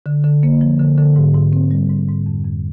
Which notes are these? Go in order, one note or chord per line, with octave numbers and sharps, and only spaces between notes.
D3
D3
A#3
F3
D3
D3
G#2
G#2
C4
G3
G#2
G#2
F2
F2